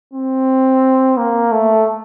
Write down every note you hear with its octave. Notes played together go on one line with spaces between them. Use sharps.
C4
A#3
A3